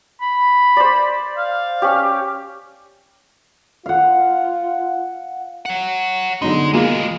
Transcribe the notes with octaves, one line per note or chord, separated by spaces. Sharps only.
B5
C5 D5
F5
C#4 G4
F4 F5 F#5
C#5 F#5
D3 F#3 G#3 D#4
E3 G#3 A#3 F4 D#5